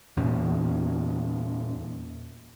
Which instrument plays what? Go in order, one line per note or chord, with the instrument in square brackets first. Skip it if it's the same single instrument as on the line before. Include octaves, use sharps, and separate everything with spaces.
[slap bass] E2 A#2 C#4